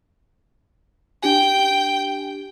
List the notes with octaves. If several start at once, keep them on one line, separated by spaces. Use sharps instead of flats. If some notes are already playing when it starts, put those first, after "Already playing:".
D4 G4 G5 G#5